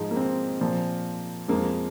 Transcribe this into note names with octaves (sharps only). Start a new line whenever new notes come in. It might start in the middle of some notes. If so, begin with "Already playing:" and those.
Already playing: G#2 F3 G#3 D#4
A#3
C4
A#2 F3 A#3
F2 F3 G#3 A#3